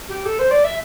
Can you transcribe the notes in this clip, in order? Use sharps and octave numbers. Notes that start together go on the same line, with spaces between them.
G4
A4
C5
D5
E5